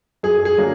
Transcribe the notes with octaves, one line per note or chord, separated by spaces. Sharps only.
F#2 G#4
G#4
D3 F#3 A#3